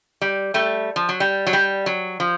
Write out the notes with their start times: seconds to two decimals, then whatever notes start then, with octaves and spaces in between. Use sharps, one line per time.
0.21 G3
0.54 G3 A3
0.96 F3
1.09 F#3
1.20 G3
1.47 F#3
1.53 G3
1.86 F#3
2.20 F3